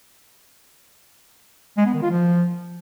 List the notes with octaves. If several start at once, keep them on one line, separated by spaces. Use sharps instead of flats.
G#3
B3
D#3
F4
F3